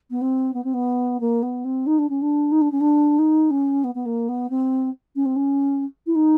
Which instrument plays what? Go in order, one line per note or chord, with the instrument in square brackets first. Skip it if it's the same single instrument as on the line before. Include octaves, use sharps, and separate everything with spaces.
[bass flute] B3
C4
B3
C4
B3
A#3
B3
C4
D#4
D4
C#4
D4
D#4
D4
C#4
D4
D#4
C#4
B3
B3
A#3
B3
C4
C#4
C4
C#4
E4
D#4